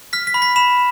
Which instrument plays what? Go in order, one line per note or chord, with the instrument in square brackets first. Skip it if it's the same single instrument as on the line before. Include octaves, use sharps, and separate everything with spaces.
[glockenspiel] F6 B6
B6
B5
B6
B5 E7